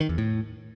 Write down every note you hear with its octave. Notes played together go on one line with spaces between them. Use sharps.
D#3
E2
A2